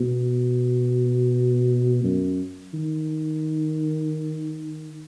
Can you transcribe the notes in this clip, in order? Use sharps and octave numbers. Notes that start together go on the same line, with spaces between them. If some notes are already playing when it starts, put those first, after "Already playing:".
Already playing: B2
F#2
D#3